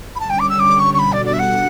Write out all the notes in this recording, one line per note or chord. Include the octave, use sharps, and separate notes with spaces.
B5
D3 G3 C#4 G4 C#5 A5
G5
D6
E6
D6
C#6
C#6
B2 G3 D4 F#4 A4 B5
D5
D5
E5
F#5